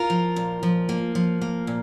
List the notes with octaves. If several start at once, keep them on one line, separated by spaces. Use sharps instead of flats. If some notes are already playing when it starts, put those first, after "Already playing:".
Already playing: F4 A#4
F3
A#2
F3
A#3
F3
A#3
A#2